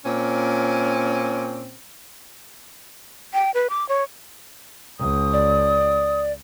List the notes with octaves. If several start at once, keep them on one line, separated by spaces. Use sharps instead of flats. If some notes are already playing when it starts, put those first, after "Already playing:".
A#2 C4 C#4
G5
B4
D6
C#5
C#2 D#6
D5